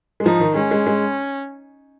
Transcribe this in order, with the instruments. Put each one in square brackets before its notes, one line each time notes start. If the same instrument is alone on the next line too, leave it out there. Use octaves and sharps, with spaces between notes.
[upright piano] G#3
[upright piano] F3 [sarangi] D#4
[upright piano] D#3
[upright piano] G#3 [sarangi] C#4
[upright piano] G#3
G#3